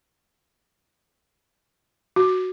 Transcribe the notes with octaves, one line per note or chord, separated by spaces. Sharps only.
F#4